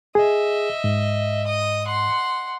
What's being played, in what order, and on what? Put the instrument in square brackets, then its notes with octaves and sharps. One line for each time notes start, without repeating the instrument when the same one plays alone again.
[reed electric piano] G#4 [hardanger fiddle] D#5 E5
[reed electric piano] G#2
[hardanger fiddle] D#5 D#6
F#5 C6